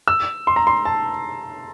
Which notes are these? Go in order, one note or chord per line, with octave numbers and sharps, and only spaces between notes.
E6
C6
A#5
C6
A5